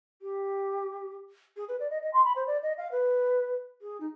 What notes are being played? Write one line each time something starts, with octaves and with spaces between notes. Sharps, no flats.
G4
G#4
B4
D5
D#5
D#5
C6
B5
C5
D5
D#5
F5
B4
G#4
D#4